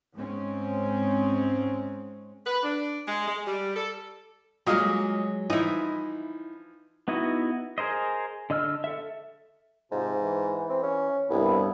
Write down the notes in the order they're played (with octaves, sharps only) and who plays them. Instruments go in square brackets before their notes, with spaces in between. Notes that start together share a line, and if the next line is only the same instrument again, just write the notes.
[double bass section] G#2 G#3 C4 C#4
[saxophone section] B4
D4
G#3
G#3
G3
A4
[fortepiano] A#2 D#5 F5 [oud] F#3 G#3
[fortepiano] E3 F3 [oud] D#4 E4
[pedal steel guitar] B3 D#4 E4 F#4 D#5
G#4 A#4 C5 D#5
D3 D#5 E6 F6
A4 E5
[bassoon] G#2 [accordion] C3 F3
[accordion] E3
[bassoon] C4
C#4
[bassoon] C2 [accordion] G2 B3 E4